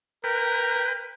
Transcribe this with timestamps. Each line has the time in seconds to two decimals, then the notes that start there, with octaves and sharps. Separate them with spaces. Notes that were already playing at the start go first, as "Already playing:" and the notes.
0.24 A#4 B4 G5